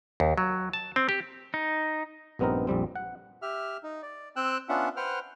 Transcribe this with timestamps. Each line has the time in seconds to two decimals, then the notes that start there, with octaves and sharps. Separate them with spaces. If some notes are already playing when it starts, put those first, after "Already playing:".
0.20 D#2
0.38 F#3
0.73 A5
0.96 C4
1.09 G4
1.54 D#4
2.39 A#1 G2 B3 C4 D#4 A#4
2.67 A#1 F2 G3 C4
2.96 F#5
3.42 G4 E5 F6
3.83 D#4
4.03 D5
4.36 C4 G5 E6 F#6
4.69 B3 C#4 D4 F4 E5 F#5
4.97 B4 C5 F#5 G5 F6